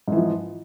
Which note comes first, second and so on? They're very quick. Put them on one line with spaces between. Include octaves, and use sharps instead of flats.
G#2 E3 F3